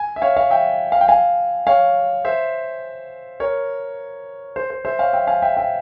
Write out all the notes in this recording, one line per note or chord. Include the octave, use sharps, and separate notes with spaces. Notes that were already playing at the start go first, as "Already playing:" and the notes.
Already playing: G#5
E5
C#5 F5
C#5 F5
E5 G5
F5
G5
F5 G#5
C#5 F5
C5 E5
A#4 C#5
C5
C5
C5 E5
C#5 F5
E5 G5
F5 G#5
E5 G5
E5 G5